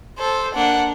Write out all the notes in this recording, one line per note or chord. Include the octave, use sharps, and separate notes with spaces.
A4 C5
A#3 D4 F#5